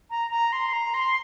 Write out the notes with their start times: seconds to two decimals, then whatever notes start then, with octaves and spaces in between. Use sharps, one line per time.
0.10 A#5
0.31 A#5
0.52 C6
0.73 A#5
0.94 C6